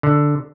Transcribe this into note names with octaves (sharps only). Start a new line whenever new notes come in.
D3